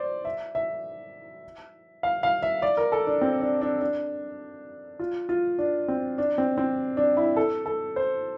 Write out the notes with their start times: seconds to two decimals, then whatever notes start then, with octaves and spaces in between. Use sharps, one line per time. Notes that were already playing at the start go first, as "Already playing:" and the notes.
Already playing: C5 D5
0.25 E5
0.55 E5
2.03 F5
2.23 F5
2.43 E5
2.62 D5
2.77 A#4
2.92 A4
3.07 D4
3.21 C4
3.41 D4
3.61 D4
3.81 D4
4.99 F4
5.29 F4
5.59 D4
5.88 C4
6.18 D4
6.38 C4
6.58 C4
6.97 D4
7.17 E4
7.36 A4
7.66 A4
7.96 C5